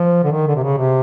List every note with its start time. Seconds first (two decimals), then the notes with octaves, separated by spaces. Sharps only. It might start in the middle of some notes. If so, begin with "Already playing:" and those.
Already playing: F3
0.24 D3
0.32 D#3
0.47 D3
0.56 C3
0.63 C#3
0.78 C3